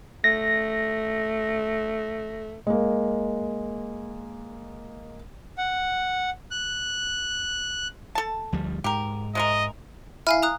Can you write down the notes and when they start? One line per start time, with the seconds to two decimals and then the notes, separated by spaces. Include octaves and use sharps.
0.24 A3 A#6
2.67 G#3 A#3
5.58 F#5
6.51 F#6
8.15 A4 A5
8.52 D2 F3 G3
8.84 G#2 G4 A#4
9.35 C3 G#3 A#4 D#5
10.27 E4 F5 G#5 F6
10.42 A#5 D#6 F#6